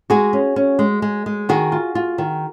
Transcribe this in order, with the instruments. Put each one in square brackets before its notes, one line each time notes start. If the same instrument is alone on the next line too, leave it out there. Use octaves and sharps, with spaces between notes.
[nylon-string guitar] G#3 F#4 G#4
C#4
C#4
G#3
G#3
G#3
D#3 F#4 G#4
F4
F4
D#3